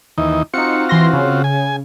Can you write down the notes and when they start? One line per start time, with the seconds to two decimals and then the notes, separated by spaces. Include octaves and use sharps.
0.18 D#2 E3 D#4
0.54 C4 D#4 F4 F#4 C#7
0.89 E3 C6 A#6
1.13 C#3
1.44 G#5